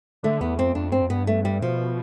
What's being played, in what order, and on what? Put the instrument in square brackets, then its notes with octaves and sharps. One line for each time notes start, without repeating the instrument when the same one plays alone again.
[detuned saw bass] D3 [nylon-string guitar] A3
[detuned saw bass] E2 [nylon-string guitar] B3
[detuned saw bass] F2 [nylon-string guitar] C4
[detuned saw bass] F2 [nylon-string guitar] D4
[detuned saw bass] G2 [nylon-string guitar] C4
[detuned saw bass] F2
[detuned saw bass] G2 [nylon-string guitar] B3
[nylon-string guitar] A3
G3
[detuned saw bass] B2 [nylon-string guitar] F3